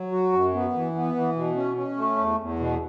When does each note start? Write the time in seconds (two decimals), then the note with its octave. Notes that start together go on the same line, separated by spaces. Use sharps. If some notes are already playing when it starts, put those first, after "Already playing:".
Already playing: F#3
0.12 F#4
0.32 F#2
0.54 B3
0.74 E3
0.95 B3
1.15 E3
1.36 B2
1.56 C#4
1.76 C#4
1.97 A3
2.17 E2
2.38 E2
2.59 B2